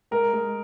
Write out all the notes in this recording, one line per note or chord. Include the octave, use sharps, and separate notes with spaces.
G#3 A#4
G#3